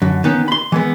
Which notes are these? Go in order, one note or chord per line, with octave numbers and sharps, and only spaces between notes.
F#2 D3
D#3 B3 C#4
B5 C6
E3 G#3 B3